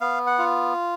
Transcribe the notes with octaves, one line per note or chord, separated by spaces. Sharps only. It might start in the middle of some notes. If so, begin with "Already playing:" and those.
B3 F5
F#5
F4